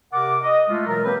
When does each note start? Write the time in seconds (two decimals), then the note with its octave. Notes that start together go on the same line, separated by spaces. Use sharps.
0.13 C3 A#4 F#5 D6
0.42 D#5
0.69 G#3 A3 F4
0.87 B2 E3 F#3 A#4
1.05 F#3 A#3 C4 G4 B4